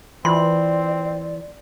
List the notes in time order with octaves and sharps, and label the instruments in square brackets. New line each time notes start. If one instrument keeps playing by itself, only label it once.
[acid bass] E3 [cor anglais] C4 [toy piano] F4 C6 [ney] D5